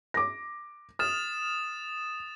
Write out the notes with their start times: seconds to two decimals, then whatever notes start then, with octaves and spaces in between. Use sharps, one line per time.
0.14 D6 A#6
0.99 D#6 F6 A6 E7